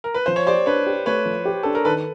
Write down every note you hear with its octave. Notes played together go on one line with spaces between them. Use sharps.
A#4
B4
F3 C5
C#5
G4 C5 D5
D4 B4 C#5
G4
A3 B4 C#5
F3
G4
D4 A4
A#4
D#3 A4 B4